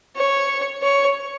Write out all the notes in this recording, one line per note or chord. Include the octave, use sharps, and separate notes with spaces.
C#5
C#5